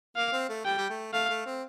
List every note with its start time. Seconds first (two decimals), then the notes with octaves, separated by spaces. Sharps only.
0.16 A#3 F5
0.32 C4
0.49 A3
0.65 G3 G5
0.78 G3
0.90 A3
1.13 A3 F5
1.29 A3
1.46 C4